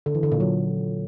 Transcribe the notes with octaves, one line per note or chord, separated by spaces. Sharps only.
D3
E3
D3
A#2
F#3